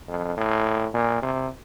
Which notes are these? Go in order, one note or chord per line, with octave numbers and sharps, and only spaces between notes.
F2
A2
A#2
C3